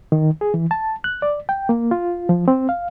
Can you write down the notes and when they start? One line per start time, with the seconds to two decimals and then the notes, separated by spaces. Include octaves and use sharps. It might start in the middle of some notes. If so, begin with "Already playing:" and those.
0.12 D#3
0.41 G#4
0.54 E3
0.71 A5
1.04 F#6
1.22 D5
1.49 G5
1.69 A#3
1.91 F4
2.29 F3
2.48 C4
2.69 F5